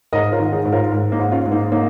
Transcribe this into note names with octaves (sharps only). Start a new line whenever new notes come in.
G#2 A#4 D#5
F4 A#4
D#3
D#4 G#4
G#2
F4 A#4
G#2
A#3 D#4
G#2
C#4 F4
G#2
A#3 D#4
A#3 D#4